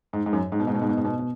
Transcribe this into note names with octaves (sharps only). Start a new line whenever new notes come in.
G#2
G#2
F#2
G#2
B2
G#2
B2
G#2
B2
G#2
B2
B2